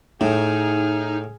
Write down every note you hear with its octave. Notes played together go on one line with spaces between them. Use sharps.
A2 D#4 G#4 F6